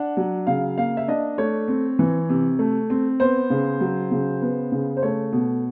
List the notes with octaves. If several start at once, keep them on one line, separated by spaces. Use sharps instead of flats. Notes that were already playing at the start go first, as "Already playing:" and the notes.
Already playing: D4 F#5
F#3
C#3 F5
A#3 F5
E5
D4 D#5
A3 C#5
C4
E3
C3
A3
C4
B3 C5
C#3
F#3
C#3
B3
C#3
C5
A3 C#5
B2